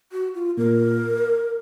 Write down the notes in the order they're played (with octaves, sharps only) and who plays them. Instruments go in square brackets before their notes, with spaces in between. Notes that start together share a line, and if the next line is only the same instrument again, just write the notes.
[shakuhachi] F#4
F4
[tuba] A#2 [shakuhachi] A#4